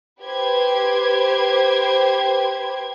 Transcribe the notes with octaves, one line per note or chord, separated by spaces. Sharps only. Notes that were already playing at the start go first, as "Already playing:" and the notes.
G4 B4 C5 G#6